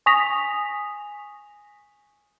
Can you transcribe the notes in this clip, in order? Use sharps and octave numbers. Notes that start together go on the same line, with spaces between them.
G#5 C#6 D#6 A#6 B6 F7